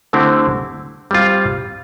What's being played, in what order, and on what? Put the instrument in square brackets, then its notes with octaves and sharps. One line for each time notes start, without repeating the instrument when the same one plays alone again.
[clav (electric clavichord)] D3 A3 C4 E4 G4
G3 C4 F4